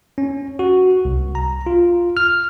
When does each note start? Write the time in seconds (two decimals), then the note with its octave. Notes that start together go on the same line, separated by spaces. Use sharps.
0.18 C#4
0.59 F#4
1.05 C2
1.35 A#5
1.66 F4
2.17 F6